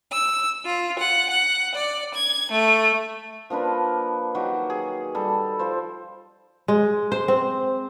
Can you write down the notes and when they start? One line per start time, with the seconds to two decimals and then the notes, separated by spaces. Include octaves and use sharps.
0.12 E6
0.65 F4
0.99 F#5
1.29 F#5
1.75 D5
2.15 G#6
2.51 A3
3.50 F3 A#3 D4 B4
4.35 D#3 F#3 F#4 G4
4.70 G#4
5.15 G3 A4
5.59 F3 C5
6.68 G#3
7.12 C5
7.28 C4